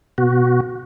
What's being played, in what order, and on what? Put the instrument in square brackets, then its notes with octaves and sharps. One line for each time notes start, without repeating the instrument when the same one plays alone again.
[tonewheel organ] B2 F#4